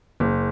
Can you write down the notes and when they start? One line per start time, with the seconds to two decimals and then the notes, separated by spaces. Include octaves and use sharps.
0.20 F#1